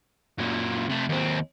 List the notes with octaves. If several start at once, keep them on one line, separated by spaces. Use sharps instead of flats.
F#2 A#2
C3 A3
D#2 C4